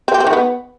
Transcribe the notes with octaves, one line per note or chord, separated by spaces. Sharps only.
C4
G4
C4
D#3
B3